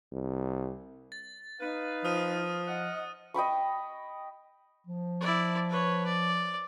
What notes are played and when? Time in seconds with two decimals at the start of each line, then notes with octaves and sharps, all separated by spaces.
0.13 C2
1.12 A6
1.60 D#4 B4 F5
2.04 F3 D#6 F6 D#7
2.68 D#5 F#5
3.34 D#5 G5 B5 C#6
4.87 F3
5.21 E4 D5
5.69 B4 C#5
6.06 D5